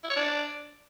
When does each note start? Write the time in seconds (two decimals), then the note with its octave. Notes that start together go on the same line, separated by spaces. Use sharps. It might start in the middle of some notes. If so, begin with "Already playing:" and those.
0.04 E4
0.10 C#5
0.16 D4